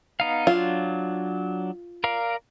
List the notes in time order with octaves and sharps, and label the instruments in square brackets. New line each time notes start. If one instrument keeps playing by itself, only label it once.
[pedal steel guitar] B3 D#4 F5
[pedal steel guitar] F#3 D4 [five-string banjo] F4
[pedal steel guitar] A#4 D5 F5